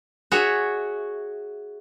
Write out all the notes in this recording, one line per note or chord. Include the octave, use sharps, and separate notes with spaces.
F#4 G#4 C#5 E5